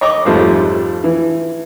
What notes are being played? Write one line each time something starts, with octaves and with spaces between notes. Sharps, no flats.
C#5 D#5 C#6 D6
F2 G#2 F3 G3 A3
E3